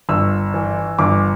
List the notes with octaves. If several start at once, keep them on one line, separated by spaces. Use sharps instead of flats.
G1 E6
E3
G1 D6